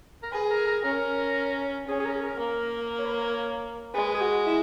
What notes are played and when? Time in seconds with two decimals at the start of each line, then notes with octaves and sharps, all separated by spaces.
0.23 A#4
0.32 G#4 B4
0.50 A#4
0.67 A#4
0.84 C#4 A#4
1.87 C#4 G#4
2.00 G#4
2.05 A#4
2.15 G#4
2.23 A#4
2.39 A#3
2.98 C#5
3.05 B4
3.13 C#5
3.94 G#3 B4
4.14 G#4
4.21 F#4
4.46 E4